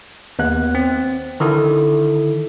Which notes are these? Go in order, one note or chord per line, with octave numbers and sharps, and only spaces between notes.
D#2 B3 F#6
C4
D3 D#3 E4 A4